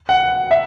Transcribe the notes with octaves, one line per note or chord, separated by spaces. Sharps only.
F#5
E5